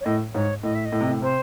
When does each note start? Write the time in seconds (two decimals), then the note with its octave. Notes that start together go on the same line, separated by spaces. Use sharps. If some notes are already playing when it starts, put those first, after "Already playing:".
0.01 C#5
0.05 A2 D#5
0.34 G#2 C#5
0.63 A2 D#5
0.75 E5
0.85 D#5
0.92 A2
1.00 C3
1.08 A2
1.22 C3 C5